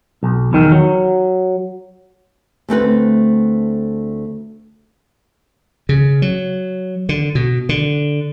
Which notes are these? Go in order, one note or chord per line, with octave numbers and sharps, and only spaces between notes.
B1
E2 D#3
F#3
D2 A3 C4 B4
C#3
F#3
D3
B2
D3